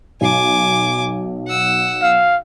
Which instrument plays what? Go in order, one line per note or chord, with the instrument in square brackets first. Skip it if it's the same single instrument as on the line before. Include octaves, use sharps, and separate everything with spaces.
[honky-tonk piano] B1 [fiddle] G#5 D6
[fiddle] F#5 E6
[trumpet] F5